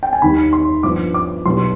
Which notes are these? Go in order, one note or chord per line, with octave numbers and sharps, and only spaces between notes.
G5
G#5
D#2 D#3 G3 B5
C6
G2 F3 B3 D6
D6
B1 B2 G3 C6